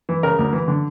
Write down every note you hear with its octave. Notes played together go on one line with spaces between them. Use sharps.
E3
C#3 A#4
D2
E3
D3